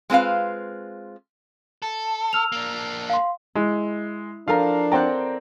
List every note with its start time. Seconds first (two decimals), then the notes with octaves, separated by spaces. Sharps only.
0.10 G#3 C4 F4 B4 F5
1.82 A4
2.33 E6 F6 F7
2.52 A#3 D4
3.10 F5 C6
3.55 G#3 E4
4.48 F3 D4 A4 A#4 F5 A#5
4.92 C4 D5 F#5 G5 A#5